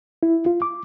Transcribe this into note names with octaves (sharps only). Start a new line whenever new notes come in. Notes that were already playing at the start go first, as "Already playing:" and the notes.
E4
F4
D6